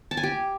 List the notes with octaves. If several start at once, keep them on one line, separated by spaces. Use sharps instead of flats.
A5
G#5
G4